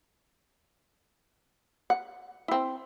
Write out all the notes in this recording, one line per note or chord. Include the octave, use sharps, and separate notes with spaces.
F#5
C4 E4